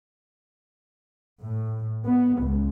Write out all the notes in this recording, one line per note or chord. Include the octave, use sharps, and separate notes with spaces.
A2
B3
C#2